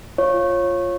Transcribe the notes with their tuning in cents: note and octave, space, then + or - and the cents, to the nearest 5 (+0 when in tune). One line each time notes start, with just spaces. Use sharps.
F4 +0 C#5 -20